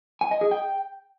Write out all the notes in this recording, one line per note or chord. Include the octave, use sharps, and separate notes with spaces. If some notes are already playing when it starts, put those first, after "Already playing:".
G#5
D#5
G#4
G5